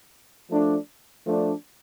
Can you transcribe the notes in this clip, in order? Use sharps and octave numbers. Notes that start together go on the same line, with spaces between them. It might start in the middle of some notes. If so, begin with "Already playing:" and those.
F3 A3 D4
F3 A3 D4